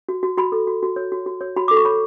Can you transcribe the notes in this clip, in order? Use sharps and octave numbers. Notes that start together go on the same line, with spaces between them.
F#4
F#4
F#4 B5
A4
F#4
F#4
C#5
F#4
F#4
C#5
F#4 B5
A4 D6
C#6
C#5 B5